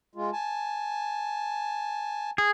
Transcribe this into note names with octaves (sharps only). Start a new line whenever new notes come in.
G#3 F4
G#5 A5
G#4